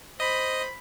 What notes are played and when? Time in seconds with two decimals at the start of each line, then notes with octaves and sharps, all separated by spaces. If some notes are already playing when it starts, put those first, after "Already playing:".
0.20 C5 D#5 B5